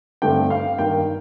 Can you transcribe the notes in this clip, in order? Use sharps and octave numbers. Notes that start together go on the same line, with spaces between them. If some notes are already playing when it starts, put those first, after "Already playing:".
G2 D3 A3 C4 G5
F5
G2 D#3 A#3 G5